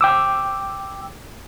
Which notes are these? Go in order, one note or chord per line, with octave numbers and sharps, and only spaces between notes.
G5 D6 E6